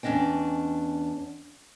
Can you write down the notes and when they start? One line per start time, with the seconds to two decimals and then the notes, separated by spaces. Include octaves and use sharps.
0.03 E2 C#4 D4 D#5 G5